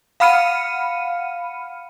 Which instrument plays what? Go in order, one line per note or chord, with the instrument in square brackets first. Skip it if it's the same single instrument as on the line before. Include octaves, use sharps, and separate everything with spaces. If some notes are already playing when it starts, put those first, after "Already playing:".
[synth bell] F5 F#5 B5 F6 C#7 D#7